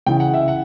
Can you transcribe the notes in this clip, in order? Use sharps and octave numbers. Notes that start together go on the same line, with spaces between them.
C#3 E3 G5
F#5
E5
F#5